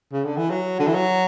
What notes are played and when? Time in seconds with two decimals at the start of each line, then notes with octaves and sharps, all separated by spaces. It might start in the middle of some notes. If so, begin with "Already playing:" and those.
0.12 C#3
0.24 D3
0.37 E3
0.50 F#3
0.79 D3
0.87 E3
0.94 F#3